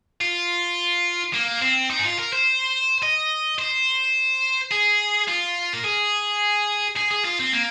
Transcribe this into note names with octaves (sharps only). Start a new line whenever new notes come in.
F4
A#3
C4
D#4
G#4
F4
A#4
C5
D#5
C5
G#4
F4
A#4
G#4
G#4
G#4
F4
C4
A#3